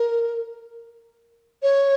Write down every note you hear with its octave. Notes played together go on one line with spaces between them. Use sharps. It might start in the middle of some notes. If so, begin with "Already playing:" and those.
Already playing: A#4
C#5